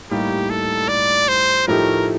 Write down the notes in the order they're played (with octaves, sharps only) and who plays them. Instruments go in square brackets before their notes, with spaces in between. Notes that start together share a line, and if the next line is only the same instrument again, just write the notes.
[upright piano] A2 G3 A#3 D#4 [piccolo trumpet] G4
[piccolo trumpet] A4
D5
C5
[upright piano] A2 F3 A3 D#4 G4 [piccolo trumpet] A#4